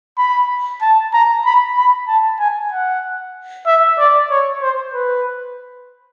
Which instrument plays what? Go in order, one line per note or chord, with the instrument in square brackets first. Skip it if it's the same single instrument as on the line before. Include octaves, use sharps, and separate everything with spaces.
[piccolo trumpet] B5
A5
A#5
B5
B5
A5
G#5
F#5
E5
D5
C#5
C5
B4